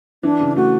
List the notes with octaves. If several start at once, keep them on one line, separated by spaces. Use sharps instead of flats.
E3 D4
C#3
A3 F#4